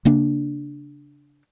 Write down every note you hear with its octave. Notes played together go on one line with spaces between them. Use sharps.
C#3 A#3 D4